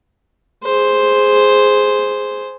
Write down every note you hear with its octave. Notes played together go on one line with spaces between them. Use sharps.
G#4 C5